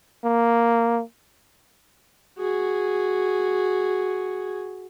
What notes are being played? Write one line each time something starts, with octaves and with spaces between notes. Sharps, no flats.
A#3
F#4 G#4